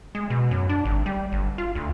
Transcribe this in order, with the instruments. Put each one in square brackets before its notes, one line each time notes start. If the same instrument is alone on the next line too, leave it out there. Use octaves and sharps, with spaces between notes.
[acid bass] G#3
B2
F#2
D4
G#1
G3
G1
F4
D2